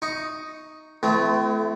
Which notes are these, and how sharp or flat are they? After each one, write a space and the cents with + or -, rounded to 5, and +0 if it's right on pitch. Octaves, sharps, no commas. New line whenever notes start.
D#4 +0 C#6 +0
E3 +35 A3 -15 C4 -40